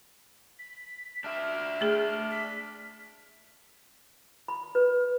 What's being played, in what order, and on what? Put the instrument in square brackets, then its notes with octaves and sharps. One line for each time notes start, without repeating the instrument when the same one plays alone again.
[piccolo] B6
[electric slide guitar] D4 E5 [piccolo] F6
[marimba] A3 G#4
[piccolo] B6
[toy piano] B5
B4